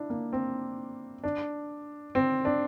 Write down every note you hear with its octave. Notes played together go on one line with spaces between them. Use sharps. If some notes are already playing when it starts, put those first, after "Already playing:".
Already playing: D4 E4
A#3
C4
D4
C4
D4